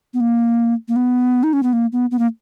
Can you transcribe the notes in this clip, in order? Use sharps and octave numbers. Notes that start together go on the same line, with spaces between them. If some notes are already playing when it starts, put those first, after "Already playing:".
B3
A#3
A#3
B3
D#4
C#4
B3
A#3
B3
B3
A#3